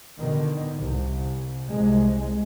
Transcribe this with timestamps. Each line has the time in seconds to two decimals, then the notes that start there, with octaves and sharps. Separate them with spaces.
0.20 B2 D3 D#3
0.78 C2
1.67 C2 G#3